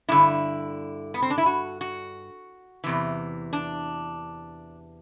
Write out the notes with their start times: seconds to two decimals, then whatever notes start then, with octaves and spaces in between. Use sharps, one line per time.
0.09 G2 D3 E4
1.14 B3
1.22 C4
1.30 D4
1.38 E4
1.46 F#4
1.81 F#4
2.84 E2 C3 E3
3.53 D4